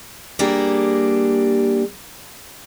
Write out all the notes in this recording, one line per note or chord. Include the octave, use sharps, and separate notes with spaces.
G3 A#3 D4 G4 G#4